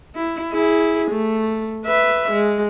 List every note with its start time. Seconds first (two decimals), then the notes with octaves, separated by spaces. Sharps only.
0.16 E4
0.53 E4 G#4
1.11 A3
1.85 B4 E5
2.32 G#3